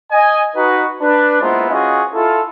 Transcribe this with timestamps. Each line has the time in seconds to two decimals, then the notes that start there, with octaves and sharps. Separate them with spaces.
0.11 D#5 G#5
0.54 D#4 F#4 B4
1.01 D4 B4
1.41 G#3 A#3 B3 E4 F4 C5
1.70 C#4 F4 F#4 G#4 D#5
2.13 E4 F4 A4